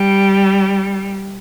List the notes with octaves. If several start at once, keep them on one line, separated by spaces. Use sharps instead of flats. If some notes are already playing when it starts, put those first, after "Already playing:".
Already playing: G3